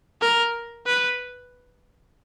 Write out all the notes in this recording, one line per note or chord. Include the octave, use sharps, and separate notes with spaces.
A#4
B4